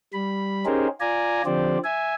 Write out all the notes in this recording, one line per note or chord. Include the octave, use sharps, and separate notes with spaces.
G3 B5
C#4 D#4 G4 G#4 A#4 C5
F4 D5 G#5 A#5
D3 F3 C4 G4 C5 D5
E5 G#5